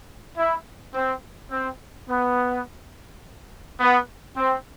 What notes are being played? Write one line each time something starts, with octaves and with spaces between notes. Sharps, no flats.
E4
C4
C4
B3
B3
C4